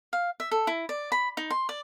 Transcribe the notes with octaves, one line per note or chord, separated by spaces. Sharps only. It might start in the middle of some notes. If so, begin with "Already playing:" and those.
F5
E5
A4
E4
D5
B5
D#4
C6
D5